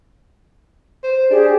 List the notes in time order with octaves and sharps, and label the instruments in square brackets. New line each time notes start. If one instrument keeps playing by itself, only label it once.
[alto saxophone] C5
[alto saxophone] D4 [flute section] G4 G#4